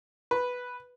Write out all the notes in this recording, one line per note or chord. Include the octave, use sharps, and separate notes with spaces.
B4